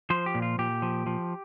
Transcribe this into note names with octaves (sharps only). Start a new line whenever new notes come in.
F3 C5
G4
A#2
F4
A#2 G4
F3
F3